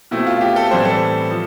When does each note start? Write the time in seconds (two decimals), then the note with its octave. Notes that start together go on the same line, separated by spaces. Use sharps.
0.11 B2 A3 C4 E4
0.26 F4
0.41 G4
0.56 A4
0.71 A2 E3 G3 C4 C5
0.85 A4
1.30 F3